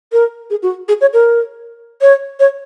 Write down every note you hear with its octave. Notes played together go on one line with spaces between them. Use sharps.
A#4
G#4
F#4
G#4
C#5
A#4
C#5
C#5